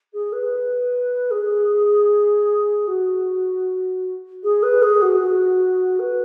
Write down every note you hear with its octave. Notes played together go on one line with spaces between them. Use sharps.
G#4
B4
G#4
F#4
G#4
B4
G#4
F#4
F#4
B4